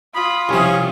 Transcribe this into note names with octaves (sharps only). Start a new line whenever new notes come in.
F4 B5 D#6
C2 F3 C#4